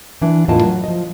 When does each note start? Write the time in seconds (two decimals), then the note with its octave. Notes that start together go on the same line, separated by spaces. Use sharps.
0.22 E3 D4
0.48 E2 A2 F4 A#4 D#5 A5
0.63 F#3
0.84 F3 D#5